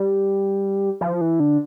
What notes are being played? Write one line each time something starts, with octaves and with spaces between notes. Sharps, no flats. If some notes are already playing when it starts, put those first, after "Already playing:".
Already playing: G3
F3
E3
D3